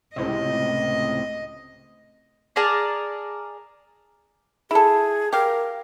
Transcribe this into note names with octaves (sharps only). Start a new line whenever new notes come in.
C#2 A2 C3 D#5
G#4 A#4 D5 A5
E4 G#4 A4
G4 A#4 F5